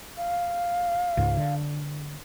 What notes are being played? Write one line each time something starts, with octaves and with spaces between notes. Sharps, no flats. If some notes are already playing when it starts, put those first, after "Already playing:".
F5
C#2 G#2
D3